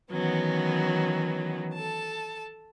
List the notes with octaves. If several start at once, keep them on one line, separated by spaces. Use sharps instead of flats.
D#3 E3 F#3 B3 C#4
A4 A5